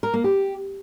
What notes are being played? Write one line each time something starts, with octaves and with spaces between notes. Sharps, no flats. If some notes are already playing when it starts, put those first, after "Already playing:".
A#4
A#3
G4